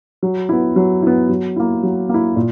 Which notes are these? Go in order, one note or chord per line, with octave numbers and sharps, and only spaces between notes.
F#3
B3 E4
F#3
B3 E4
F#3
A#3 E4
F#3
A#3 E4
A#2